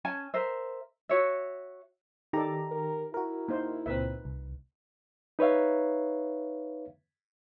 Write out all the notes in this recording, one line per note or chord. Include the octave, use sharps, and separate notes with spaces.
C#4 G#5 A5
A#4 C5 E5
F#4 C#5 E5
D#3 D#4 G4 A4 D5 A#5
A#4
E4 F#4 A#4
A#3 D#4 C5
C#2 A#2 C4 A#4 B4 E5
C2
D#4 B4 C#5 E5 F5